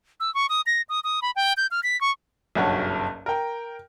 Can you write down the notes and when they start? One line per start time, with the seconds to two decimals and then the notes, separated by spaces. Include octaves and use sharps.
0.20 E6
0.35 C#6
0.49 D#6
0.66 A#6
0.89 D#6
1.04 D#6
1.22 B5
1.36 G5
1.57 G6
1.71 F6
1.83 B6
2.01 C#6
2.55 F#1 B1 G2 C#5 F#5
3.26 A#4 G5